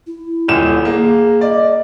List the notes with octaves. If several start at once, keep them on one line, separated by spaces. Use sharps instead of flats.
E4
D#1 E7
A#3 G#4
D5 D#5